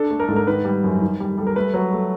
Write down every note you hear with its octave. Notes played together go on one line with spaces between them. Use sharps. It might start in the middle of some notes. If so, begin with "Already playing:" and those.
Already playing: D4 A4
A3
A#4
G#2 A4
A#4
D#3 B4
G3
F#2
D#3
G3
G3 A4
A#4
A3 B4
F#3
A3